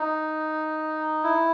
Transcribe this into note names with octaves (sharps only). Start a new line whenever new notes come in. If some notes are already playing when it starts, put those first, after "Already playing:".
Already playing: D#4
E4